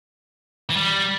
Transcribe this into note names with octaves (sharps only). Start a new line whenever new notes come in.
E3
G3